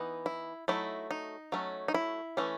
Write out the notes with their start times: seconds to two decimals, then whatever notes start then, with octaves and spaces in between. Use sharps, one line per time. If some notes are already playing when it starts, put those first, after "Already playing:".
Already playing: E3 B3 D#4
0.26 E4
0.68 F#3 A3 D#4 E4
1.11 D#4
1.52 F#3 A3 C#4
1.88 D#4
1.94 E4
2.37 E3 A3 C#4